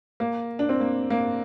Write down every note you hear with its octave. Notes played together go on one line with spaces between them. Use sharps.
A#3
D4
C4
A#3
A#3